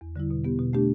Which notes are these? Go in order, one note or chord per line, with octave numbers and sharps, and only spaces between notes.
E2
D3 G3 E4
B2
B3 G4
B2
A3 D4 G4